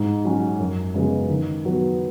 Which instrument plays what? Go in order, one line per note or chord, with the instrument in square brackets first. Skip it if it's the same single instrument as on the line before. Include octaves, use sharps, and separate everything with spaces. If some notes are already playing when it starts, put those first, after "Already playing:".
Already playing: [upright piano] G#2
F#3 C#4 F#4
F#2
C#3 G#3 B3
D#3
F#3 B3 F#4